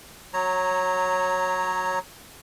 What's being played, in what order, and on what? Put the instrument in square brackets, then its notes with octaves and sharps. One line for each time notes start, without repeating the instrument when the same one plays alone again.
[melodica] F#3 C#5 A#5